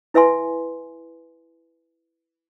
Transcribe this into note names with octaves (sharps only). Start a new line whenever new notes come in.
E4 B4 E5 G#5 C6